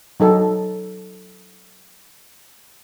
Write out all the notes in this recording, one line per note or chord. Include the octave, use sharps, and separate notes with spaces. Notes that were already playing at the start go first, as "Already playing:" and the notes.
F#3 D#4 A4